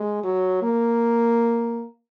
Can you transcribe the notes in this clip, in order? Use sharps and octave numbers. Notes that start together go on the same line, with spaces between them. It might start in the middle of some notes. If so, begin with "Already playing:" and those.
Already playing: G#3
F#3
A#3